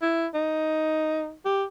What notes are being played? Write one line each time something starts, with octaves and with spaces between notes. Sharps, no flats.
E4
D#4
G4